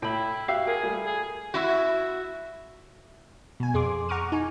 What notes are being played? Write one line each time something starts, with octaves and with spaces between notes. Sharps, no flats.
A2 E4 G5 B5
F#4 G4 E5 F5
G#4 A#4
G3 A3
G#4
E4 F#4
B2 G#5
F2 G#4 C6 D6
F#5 A#5 C#6 D6 F6 D#7
D#4 G#5